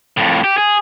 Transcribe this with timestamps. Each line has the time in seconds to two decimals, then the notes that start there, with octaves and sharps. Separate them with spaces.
0.17 F2 A2
0.44 G4
0.58 G#4